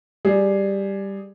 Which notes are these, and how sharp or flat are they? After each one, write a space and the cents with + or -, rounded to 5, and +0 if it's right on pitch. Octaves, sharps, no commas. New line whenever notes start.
G3 +5 G#4 +5